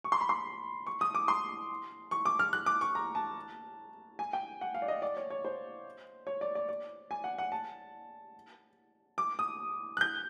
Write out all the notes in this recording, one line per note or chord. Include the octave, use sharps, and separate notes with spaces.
C#6
C6
B5
C6
C#6
D#6
D6
C6
C#6
D6
F6
F#6
D6
C#6
A#5
A5
G#5
G5
F#5
F5
D5
D#5
D5
C#5
C#5
C5
C#5
D5
D5
D5
G#5
F#5
F#5
A5
D6
D#6
F#6
G6